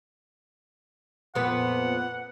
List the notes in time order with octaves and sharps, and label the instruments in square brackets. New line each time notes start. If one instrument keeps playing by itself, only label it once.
[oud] F2 A#2 B3 [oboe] F#5